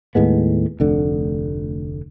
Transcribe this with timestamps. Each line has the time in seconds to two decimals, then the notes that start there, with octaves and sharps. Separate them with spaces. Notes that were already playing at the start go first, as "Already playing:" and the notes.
0.15 D#2 A2 G#3 B3
0.80 F1 D2 D3